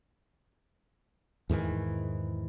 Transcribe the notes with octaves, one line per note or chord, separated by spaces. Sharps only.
E2 G#2 D#3 E3